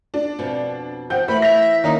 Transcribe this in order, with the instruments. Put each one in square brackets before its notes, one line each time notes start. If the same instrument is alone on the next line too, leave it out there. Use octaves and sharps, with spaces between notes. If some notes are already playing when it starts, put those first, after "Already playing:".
[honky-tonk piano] D4
[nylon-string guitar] F2 B2
[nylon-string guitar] F3 [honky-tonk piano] F#5 G5 G6
[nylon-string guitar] E3 [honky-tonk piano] A3 [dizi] B5
[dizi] E5 [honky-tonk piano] A#6 F7
[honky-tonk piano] D#3 A#3 C#4 [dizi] D#4